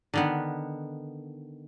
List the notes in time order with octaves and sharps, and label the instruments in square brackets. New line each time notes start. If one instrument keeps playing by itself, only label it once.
[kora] D3 D#3 B3